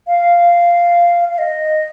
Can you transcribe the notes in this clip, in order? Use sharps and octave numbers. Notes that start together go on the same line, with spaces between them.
F5
F5
D#5